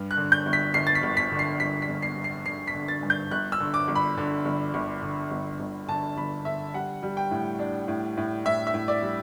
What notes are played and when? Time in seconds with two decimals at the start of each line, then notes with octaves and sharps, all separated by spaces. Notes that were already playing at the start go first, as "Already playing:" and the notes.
Already playing: G2
0.11 F#6
0.17 D3
0.32 G6
0.46 G1
0.53 B6
0.74 G1 C7
0.87 A6
0.95 B6
1.03 G1
1.17 B6
1.32 D3
1.39 C7
1.60 G1 B6
1.82 B6
1.89 G1
2.02 C7
2.17 G1
2.24 C7
2.46 D3 C7
2.67 B6
2.74 D3
2.88 A6
3.03 G2
3.10 G6
3.31 G1 F#6
3.52 E6
3.60 D3
3.74 D6
3.88 G1
3.95 B5
4.17 D3
4.45 G1
4.74 G1
5.02 D3
5.31 G1
5.60 G1
5.88 D3 A5
6.17 G1 B5
6.45 D3 E5
6.74 G3 F#5
7.03 G3
7.17 G5
7.31 A2
7.59 D4
7.88 A2
8.17 A2
8.45 A2 E5
8.67 E5
8.74 A2
8.88 D5
9.02 G3